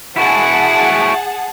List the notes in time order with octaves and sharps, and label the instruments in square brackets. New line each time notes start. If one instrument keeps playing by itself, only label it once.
[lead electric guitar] E4 F#4 [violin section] G#4 F#5 A5